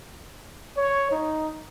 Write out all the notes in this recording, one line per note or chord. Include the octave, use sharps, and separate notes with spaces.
C#5
D#4